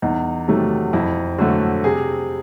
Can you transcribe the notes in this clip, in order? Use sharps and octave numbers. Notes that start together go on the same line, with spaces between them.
E2 D#4
C3 D#3 F#3 A3
F2 E4
D3 F#3 A3 F#4
C3 G#4